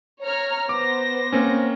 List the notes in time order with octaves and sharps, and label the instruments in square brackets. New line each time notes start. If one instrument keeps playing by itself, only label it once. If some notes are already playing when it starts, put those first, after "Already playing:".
[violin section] C#5 A#5 F6
[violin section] B3 C5 A#6 [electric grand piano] D6
[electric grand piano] A#3 C4 C#4